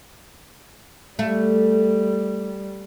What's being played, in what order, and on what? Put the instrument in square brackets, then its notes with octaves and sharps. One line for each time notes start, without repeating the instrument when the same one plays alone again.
[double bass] G3 [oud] A3